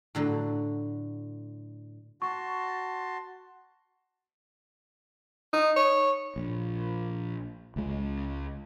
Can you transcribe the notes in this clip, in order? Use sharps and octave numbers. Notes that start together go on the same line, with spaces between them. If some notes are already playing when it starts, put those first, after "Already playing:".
A2 D3 F#3
F#4 A5 C6 C#6
D#4
C#5
A#1
C#2 G#3